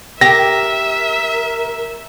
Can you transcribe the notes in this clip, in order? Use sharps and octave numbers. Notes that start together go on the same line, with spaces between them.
G4 A#4 E5 A#6